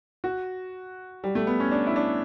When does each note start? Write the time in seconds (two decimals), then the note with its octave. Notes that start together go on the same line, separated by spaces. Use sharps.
0.24 F#4
1.24 G3
1.35 A3
1.47 B3
1.60 C#4
1.71 D4
1.87 E4
1.96 D4